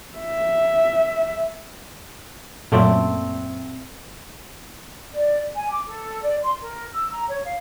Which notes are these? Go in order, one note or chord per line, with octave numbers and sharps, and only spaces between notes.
E5
F#2 A#2 A3 C4 D5
D5
G#5
D6
A4
D5
C6
A#4
E6
A#5
C#5
F5